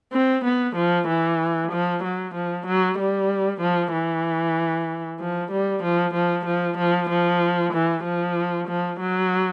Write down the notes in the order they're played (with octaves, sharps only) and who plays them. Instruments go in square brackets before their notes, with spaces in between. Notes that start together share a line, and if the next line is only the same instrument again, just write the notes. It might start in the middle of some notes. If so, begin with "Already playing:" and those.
[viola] C4
B3
F3
E3
F3
F#3
F3
F#3
G3
F3
E3
F3
G3
F3
F3
F3
F3
F3
E3
F3
F3
F#3